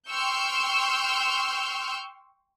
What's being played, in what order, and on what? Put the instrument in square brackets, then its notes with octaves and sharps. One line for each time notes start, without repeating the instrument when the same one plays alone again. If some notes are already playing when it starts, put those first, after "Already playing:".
[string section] G5 C6 C#6 E6 F6 G6